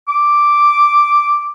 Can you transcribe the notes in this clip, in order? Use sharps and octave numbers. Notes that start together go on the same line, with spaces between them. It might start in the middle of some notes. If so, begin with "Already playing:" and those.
D6